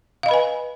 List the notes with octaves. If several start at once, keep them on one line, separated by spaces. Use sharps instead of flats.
B4 D#5 F5 G#5 B5